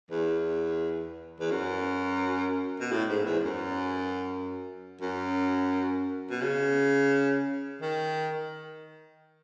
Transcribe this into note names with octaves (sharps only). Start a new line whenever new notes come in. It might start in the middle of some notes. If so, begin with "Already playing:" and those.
E2
E2
F#2
B2
A2
G#2
E2
F#2
F#2
B2
C#3
D#3